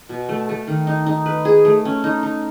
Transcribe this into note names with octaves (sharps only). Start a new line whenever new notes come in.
B2
A3
A3
D#3
D#4
D#4
B4
G#4
A3
C#4
D#4
D#4